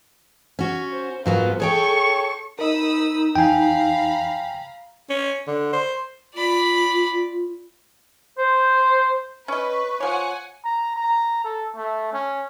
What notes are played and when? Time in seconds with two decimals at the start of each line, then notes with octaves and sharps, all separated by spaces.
0.59 C#4 F#4
0.91 C5
1.26 G#2 F#3 B3 F4 A#4
1.60 G#4 A4 C#5 G5 C#6
2.59 D#4 A#4 D#5 B5 D#6 E6
3.35 F2 E3 F5 G5 G#5 A#5 B5
5.10 C#4
5.47 D3
5.73 C5
6.35 F4 D5 B5
8.38 C5
9.48 C#4 B4 D#5 C#6
10.00 F3 C#5 F#5 G#5
10.65 A#5
10.96 A#5
11.44 A4
11.76 A3
12.13 C#4